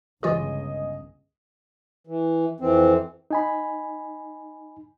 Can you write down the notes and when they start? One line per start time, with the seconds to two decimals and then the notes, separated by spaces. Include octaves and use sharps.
0.23 G1 C#2 E3 F4 G4 G#4 D#5 D#6
2.07 E3
2.60 F2 E3 C4
3.31 D#4 G#5 B5